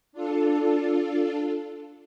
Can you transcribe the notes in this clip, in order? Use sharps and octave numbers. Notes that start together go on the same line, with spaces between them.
D4 F4 A4